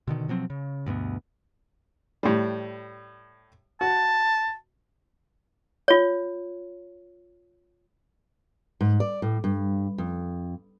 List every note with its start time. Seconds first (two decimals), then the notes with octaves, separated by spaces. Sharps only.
0.08 B2 D3 D#3
0.28 B2 F3 F#3 C4
0.50 C#3
0.87 D2 G2 B2 B3
2.23 A2 G3
3.81 F#4 A5
5.88 F4 C#5
8.81 G#2
9.00 D5
9.22 A2
9.44 G2
9.98 F2